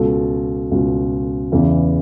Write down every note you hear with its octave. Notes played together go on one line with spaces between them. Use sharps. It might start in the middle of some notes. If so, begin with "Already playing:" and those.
Already playing: C#2 B2 A4
C#2 B2
E2 C#3 E3